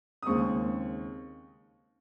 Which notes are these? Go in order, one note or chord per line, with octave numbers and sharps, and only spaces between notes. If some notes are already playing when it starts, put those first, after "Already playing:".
D#6
D#2 C#3 G#3 C4 C#6